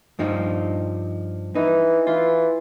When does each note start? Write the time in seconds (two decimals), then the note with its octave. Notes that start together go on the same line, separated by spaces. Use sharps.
0.19 G2 F3 D#4
1.55 E3 D#4
2.07 E3 F4